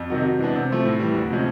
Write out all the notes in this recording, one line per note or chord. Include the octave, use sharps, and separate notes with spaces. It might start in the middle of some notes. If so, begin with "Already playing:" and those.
Already playing: F2
C3 D#3 F#3
C3
E3 G#3 B3 D4
C3
F3 A3 C4
A2
E3 G3
D2
C3 F3 G#3 C#4